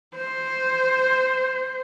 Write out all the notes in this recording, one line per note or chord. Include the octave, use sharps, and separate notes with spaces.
C5